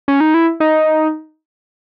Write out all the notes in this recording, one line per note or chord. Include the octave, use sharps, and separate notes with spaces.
C#4
D#4
E4
D#4